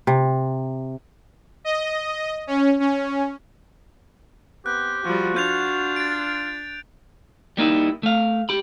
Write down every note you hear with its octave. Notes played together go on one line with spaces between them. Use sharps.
C3
D#5
C#4
C#4
B3 C4 G4 F#6
F3 G3 F#4
D4 F4 G6 F7
A6 D7
G3 A#3 D#4 E4
A3 F5
G4 B5